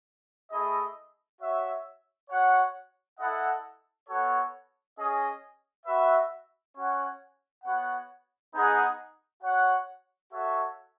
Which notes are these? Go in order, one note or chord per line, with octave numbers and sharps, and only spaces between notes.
A3 E4 G#4 D#5
F#4 C#5 E5
F#4 C#5 F#5
E4 A4 D#5 F#5
B3 F#4 A4 C#5
C#4 G#4 D#5
F#4 B4 E5
C#4 F#4 C#5 F#5
B3 F#4 C#5 F#5
B3 D#4 G#4 D#5 F#5
F#4 C#5 F#5
F#4 A4 C#5 E5